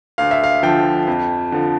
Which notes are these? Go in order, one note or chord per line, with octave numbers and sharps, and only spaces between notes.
D2 F5
E5
F5
D3 F3 G5
F2
D3 F3